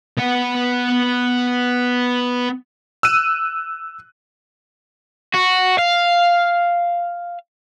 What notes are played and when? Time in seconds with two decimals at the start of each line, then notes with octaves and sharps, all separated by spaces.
0.18 B3 F#5
3.03 E6 F#6 D#7
5.34 F#4
5.79 F5